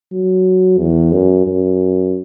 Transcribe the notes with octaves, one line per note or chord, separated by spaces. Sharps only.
F#3
E2
F#2
F#2